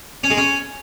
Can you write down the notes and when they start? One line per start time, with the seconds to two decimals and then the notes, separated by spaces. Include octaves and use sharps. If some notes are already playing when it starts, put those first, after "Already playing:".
0.24 C#4
0.30 G#3
0.37 C#4